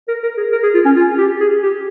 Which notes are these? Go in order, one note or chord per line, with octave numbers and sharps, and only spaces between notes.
A#4
A#4
G#4
A#4
G#4
F4
C#4
F4
G4
G#4
G4